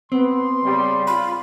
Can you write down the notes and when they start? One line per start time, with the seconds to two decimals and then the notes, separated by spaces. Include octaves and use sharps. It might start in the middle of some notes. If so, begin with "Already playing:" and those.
0.12 B3 C4 C6
0.63 C#3 G3
1.07 F4 B5